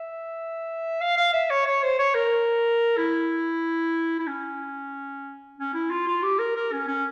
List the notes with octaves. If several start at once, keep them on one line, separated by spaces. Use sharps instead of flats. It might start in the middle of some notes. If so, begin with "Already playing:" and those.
Already playing: E5
F5
F5
E5
C#5
C#5
C5
C#5
A#4
E4
E4
C#4
C#4
E4
F4
F4
G4
A#4
A#4
C#4
C#4